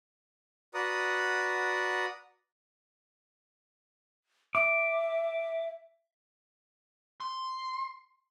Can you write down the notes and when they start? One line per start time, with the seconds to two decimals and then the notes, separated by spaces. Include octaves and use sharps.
0.74 F#4 B4 D5 F#5 A#5 D#6
4.55 E5 D6
7.20 C6